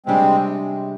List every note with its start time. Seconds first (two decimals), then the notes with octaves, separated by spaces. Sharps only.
0.06 C3 G3 G#3 C4 D4